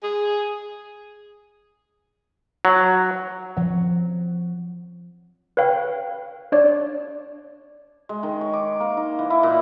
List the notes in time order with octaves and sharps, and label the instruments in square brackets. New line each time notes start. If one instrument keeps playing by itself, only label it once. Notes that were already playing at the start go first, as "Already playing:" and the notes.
[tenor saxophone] G#4
[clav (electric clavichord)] F#3
[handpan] F3 C#5 F#5
[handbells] B4 C#5 F5 G5
D4 C#5 D5
[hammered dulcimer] G#3
D#3
C#5
D6
A#3
D#4
E3
E4
A#2